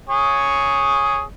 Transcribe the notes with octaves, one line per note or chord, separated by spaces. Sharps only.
G#4 C#5